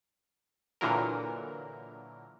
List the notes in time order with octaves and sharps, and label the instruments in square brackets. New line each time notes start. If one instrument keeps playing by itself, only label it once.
[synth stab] A#2 D3 E3 F#3 A#4